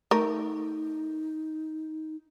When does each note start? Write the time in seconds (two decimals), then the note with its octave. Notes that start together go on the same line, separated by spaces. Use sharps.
0.11 A3 D#4 A#4